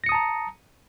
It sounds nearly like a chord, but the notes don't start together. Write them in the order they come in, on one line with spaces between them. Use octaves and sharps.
A#6 C#7 D#6 A5 A#5